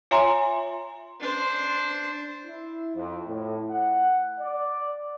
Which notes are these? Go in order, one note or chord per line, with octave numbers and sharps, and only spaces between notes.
F4 C#5 E5 G#5 A#5 C6
D4 C5
E4
F2
A2
F#5
D5